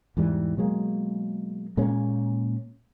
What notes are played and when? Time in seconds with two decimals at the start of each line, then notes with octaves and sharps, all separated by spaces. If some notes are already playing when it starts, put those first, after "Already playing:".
0.17 E2 G#2 E3 G3
0.57 B2 F#3 G#3 A#3
1.77 A#2 G#3 A#3 C#4